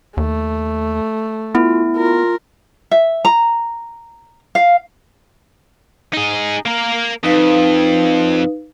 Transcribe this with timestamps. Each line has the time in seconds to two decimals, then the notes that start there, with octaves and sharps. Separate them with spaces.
0.17 D#2 A3
1.55 B3 E4 F4
1.96 F4 A#4
2.91 E5
3.25 A#5
4.55 F5
6.14 D#4 G#4
6.66 A#3 A#4
7.23 F2 D#4 B4 F5